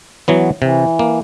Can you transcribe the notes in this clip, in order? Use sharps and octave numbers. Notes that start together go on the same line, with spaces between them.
E3 F#3 B3
C3 E3
A#3